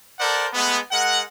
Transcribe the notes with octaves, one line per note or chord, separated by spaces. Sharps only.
A4 A#4 C5 D5 F#5
G#3 A3 B3
G#3 A#4 F#5